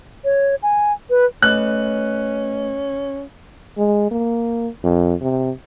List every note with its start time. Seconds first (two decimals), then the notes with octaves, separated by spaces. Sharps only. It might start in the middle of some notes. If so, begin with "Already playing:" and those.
0.24 C#5
0.63 G#5
1.10 B4
1.42 A3 C#4 B4 D#5 F#6
3.78 G#3
4.11 A#3
4.84 F2
5.21 C3